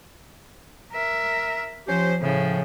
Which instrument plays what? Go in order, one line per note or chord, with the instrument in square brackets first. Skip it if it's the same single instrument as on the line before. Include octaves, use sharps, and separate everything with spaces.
[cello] A#4 E5
[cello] F3 [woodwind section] C#4 G4 C5
[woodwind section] A2 F3 [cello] C#3